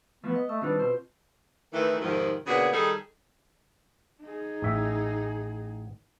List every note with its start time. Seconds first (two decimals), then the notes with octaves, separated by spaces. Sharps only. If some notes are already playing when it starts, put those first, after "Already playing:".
0.24 E3 F3 A3 B3
0.36 D#5
0.49 A3 E6
0.62 D#3 G3 C4 D4 F4 B4
0.79 B2 C5
1.73 D#3 E3 A3
1.99 F2 G#2 C3 D#3 F3
2.47 A#2 C#3 B3 D4 F#4 G#4
2.72 D#3 G3 D#4 G#4 A4
4.21 D#4 G#4
4.62 A1 E5